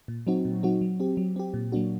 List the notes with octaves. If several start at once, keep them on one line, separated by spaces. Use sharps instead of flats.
A#2
F#3 C4 D#4 F#4
A#2
F#3 C4 D#4 F#4
F#3
C4 G4
F#3
C4 G4
A#2
F#3 A#3 D4 F#4